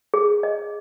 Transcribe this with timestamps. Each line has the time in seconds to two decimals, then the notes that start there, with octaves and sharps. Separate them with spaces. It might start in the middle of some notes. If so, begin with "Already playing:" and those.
0.14 G#4
0.43 D#5